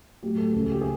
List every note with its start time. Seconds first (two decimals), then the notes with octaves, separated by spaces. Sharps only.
0.23 A2 F#3 A3 G4
0.38 A4
0.53 C#2 C#3 F3 A4
0.63 G#4
0.72 G4
0.82 G#4